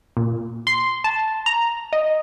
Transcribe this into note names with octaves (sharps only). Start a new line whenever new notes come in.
A#2
C6
A5
A#5
D#5